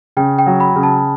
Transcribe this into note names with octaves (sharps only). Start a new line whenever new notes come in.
C#3 G5
G5
F#3
B5
C#3
A5